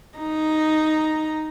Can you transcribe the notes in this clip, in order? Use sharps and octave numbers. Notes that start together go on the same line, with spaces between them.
D#4 A#5